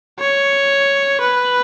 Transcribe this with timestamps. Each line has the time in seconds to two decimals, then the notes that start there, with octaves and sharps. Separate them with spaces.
0.19 C#5
1.20 B4